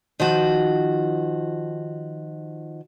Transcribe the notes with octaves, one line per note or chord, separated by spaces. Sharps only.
D#3 F3 F#4